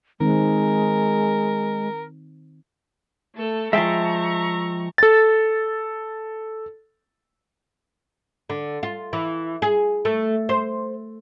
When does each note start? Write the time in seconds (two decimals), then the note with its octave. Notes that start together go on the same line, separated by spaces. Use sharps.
0.20 D#3 G#3 C4 A#4
3.35 A3 A4
3.73 F3 G#3 E5 G5 A5 A#5 C#6
4.98 A4 A6
8.50 D3
8.83 F4
9.13 E3
9.62 G#4
10.05 A3
10.49 C5